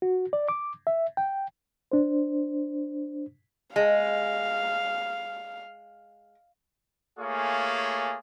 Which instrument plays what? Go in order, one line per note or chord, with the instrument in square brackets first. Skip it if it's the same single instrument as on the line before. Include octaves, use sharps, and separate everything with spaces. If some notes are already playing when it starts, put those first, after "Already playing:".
[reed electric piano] F#4
D5
D6
E5
G5
D4 C5
[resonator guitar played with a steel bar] G#3 [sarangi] F5
[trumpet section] A3 A#3 F4 G#4 C#5 G#5